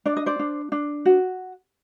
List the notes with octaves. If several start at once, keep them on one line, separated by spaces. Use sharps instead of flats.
D4 D5
D#5
C5 D5
D4
D4
F#4